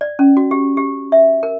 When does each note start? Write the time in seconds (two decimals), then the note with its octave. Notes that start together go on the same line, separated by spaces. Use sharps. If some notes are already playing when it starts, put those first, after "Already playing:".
0.01 D5
0.19 C#4
0.37 F#4
0.51 G4
0.77 G4
1.12 E5
1.43 A#4